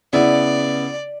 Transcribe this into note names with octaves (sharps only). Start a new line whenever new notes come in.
C#3 B3 E4 D5